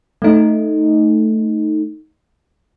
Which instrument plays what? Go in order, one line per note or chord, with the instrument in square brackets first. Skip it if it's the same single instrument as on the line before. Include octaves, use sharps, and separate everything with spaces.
[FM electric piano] A3 D#4